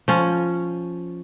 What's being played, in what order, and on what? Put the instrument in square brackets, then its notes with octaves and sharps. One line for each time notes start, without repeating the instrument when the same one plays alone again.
[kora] F3 C#4